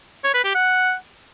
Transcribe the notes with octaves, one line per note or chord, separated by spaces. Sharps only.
C#5
B4
G4
F#5